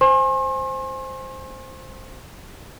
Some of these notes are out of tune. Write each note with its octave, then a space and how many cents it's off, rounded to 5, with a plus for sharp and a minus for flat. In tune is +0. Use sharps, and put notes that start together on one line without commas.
C5 +0 G#5 +0 C6 +45